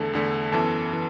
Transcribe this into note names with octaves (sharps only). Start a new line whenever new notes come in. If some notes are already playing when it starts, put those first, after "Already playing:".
Already playing: E2 D3 A3 A4 A5
E2 D3 A3
F#2 E3 B3 A4 A5
E3